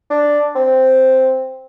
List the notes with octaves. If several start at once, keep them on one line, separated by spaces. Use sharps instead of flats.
D4
C4